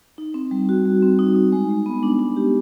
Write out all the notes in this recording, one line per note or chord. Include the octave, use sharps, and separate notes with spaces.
D#4
C4
G3
F#4
G3
C4
D#4
D#4
G#3
G#3
B3
D4
D4
G4